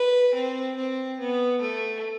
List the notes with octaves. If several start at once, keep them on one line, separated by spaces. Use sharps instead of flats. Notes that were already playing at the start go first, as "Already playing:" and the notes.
Already playing: B4
C4
C4
B3
A3